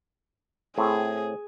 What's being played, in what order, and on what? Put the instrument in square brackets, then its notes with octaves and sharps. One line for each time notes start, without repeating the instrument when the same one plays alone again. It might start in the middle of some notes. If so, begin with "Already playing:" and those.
[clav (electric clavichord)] A2 C4 [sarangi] G#4